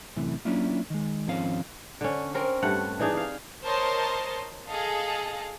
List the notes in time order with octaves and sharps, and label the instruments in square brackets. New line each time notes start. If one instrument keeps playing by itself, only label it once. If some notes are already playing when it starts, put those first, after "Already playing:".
[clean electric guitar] F#2 A2 C3 E3
F#3 A#3 C#4 D4 E4 F4
D#3 G#3
D#2 G#2 F3 C4 C#4 F5
[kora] D3 C#4
C4 C#4 A#4
G2 A3 F#5
E3 D4 D#4 G#4
D#4 F5
[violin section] A#4 C5 C#5 D#5 A5 C6
G#4 A4 D#5 F5